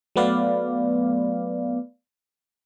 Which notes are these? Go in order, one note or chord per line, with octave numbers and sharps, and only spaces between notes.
F#3 A3 B3 B4 D5 F5